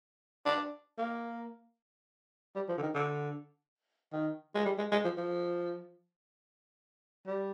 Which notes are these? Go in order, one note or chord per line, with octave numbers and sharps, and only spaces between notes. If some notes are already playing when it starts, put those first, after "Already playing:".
D4
A#3
G3
F3
D3
D#3
D3
D#3
G#3
G3
G#3
G#3
F3
F3
G3